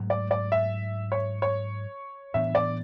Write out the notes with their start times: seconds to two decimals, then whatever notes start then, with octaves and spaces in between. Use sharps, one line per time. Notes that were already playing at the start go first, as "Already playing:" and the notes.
Already playing: G#2 F#3 A3
0.10 D5
0.31 D5
0.52 E5
1.12 C#5
1.42 C#5
2.34 A2 E3 B3 D4 E5
2.55 D5